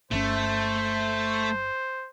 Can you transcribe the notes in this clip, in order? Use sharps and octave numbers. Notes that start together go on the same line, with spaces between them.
G1 D3 A3 C#4 C5